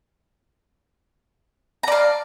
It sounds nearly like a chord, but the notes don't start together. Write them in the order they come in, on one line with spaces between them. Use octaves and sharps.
A#5 D5 F5